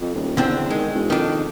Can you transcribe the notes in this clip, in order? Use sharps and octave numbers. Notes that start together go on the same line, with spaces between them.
F2
D#1
E2 D3 C4 D4
D#3 G#3
E1
F2 D#3 D4